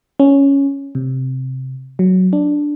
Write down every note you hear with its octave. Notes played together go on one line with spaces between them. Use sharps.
C#4
C3
F#3
D4